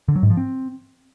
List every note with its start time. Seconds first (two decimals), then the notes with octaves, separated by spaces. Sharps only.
0.08 D3
0.16 F#3
0.23 G#2
0.30 F3
0.37 C4